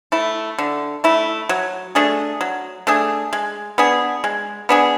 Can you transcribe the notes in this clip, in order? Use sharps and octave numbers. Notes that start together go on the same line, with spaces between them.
A3 E4
D3
A3 E4
F#3
A3 D4 G#4
F#3
A3 D4 G#4
G#3
B3 D4 G#4
G#3
B3 D4 G#4